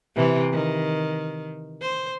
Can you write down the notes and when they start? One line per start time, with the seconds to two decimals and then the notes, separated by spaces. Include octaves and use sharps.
0.16 C3 E3
0.52 D#3
1.81 C5